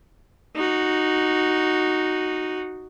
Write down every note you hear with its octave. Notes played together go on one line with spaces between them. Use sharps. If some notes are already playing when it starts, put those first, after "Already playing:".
D#4 F#4